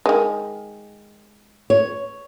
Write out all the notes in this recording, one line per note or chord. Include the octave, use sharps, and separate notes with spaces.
D#3 G#3
C#5